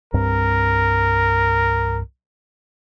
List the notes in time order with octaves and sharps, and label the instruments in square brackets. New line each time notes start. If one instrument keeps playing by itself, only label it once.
[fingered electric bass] C2 G2 C4 [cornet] A#4